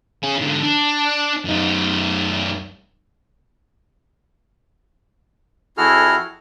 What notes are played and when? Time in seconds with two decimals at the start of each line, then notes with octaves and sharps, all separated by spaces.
0.23 C#4 G#4
0.39 G#2 D3
0.63 D4
1.45 F#2 D#4
5.77 F2 E4 F#4 G#4 A4 F6